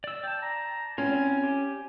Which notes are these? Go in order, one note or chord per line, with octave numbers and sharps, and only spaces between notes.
D5 E6
D5 G5 A5
A#5
C4 C#4 E4 F4 G#5
G4